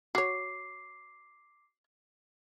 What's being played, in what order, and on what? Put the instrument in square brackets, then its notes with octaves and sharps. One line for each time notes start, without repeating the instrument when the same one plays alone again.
[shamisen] F#4 C#5 [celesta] D6 C7